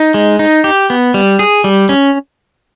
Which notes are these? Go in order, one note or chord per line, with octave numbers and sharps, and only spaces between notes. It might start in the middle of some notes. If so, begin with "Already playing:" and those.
Already playing: D#4
G#3
D#4
G4
B3
G3
G#4
G3
C#4